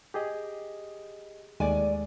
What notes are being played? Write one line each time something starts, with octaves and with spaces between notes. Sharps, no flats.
G4 G#4 D#5
D#2 G#3 A3 D5 G#5